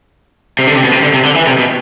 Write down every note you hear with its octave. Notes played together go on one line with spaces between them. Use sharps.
C3
D3
C3
B2
C3
D3
C3
D3
E3
C3
B2